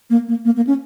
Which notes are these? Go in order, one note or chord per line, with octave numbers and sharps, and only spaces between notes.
A#3
A#3
A#3
A#3
C#4